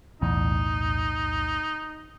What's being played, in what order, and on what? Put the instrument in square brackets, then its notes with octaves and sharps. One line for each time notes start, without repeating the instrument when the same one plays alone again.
[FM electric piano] B1 E2 A2 [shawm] D#4